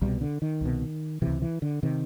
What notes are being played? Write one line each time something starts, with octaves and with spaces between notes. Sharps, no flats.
C2 B2 G3
D3
D#3
C2 B2
C#2 C3 E3
E3
D3
C3 D#3